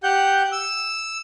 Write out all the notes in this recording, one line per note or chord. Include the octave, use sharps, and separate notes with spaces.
G4 F#5 G6
E6